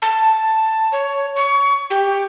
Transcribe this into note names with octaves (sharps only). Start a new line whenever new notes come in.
A5
C#5
C#6
G4